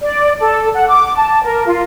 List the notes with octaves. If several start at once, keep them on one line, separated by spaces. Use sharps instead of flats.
D5
A4
F#5
D6
A5
A#4
F4